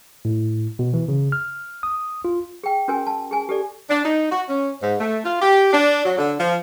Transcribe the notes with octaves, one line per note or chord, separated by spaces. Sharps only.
A2
B2
E3
C#3
F6
D#6
F4
G#4 G5
C#4 F#4 A#4 G#5
A5
G#4 G#5
G4 A4 D5
D4
D#4
F#4
C#4
G#2
A3
F4
G4
D4
F#3
D3
F3